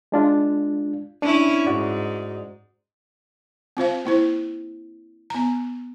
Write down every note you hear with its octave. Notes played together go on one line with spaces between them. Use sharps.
G#3 D4 F4
C#4 D4 E4
G#2 F#4 D5
C4 F4 C5 F5
A#3 E4 C5
B3 A#5